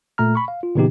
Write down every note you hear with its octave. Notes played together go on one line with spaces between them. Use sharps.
A#2 A3 A#5 F6
B5 C#6
F5
F4
A#2 C#3 E3 B3 D#4 G4